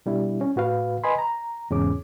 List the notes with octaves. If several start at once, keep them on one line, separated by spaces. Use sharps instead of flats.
B2 G3 D4 E4
C#4
A2 F#4 B4 F5
B4 D#5 G#5 B5 C6
A#5
E2 G#2 C#3 C#4 G#4 D6